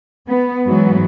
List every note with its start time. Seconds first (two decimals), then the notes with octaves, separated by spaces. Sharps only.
0.27 B3
0.66 G#2 E3 F#3 B3